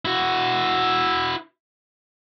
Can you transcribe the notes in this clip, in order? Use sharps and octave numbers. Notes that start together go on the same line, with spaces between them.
E4 F#4